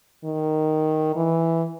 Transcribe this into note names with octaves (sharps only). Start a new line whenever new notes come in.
D#3
E3